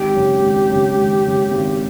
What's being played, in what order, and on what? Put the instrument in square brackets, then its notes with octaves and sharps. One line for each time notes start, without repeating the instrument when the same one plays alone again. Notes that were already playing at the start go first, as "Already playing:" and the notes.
Already playing: [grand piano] G#1 [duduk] G4
[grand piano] F#2 C#3
G#1
F#2 C#3
G#1
F#2 C#3
G#1